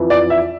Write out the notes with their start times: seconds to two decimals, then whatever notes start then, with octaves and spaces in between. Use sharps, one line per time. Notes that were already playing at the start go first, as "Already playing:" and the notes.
Already playing: F2 E3
0.10 D5
0.30 E5